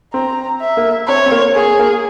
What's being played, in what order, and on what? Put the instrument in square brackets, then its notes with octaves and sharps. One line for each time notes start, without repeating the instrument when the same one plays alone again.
[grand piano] C4 [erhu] A#5
[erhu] E5
[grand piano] A#3
[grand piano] C4 [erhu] C#5
[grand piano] C4
A#3
[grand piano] A#3 [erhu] G#4
[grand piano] A#3